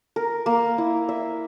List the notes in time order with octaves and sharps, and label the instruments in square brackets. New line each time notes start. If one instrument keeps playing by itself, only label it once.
[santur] A#4
A#3
E4
E5